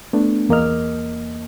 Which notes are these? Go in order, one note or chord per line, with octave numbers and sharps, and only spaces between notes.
A3 B3 D4
E2 A#3 A#4 D#5 F6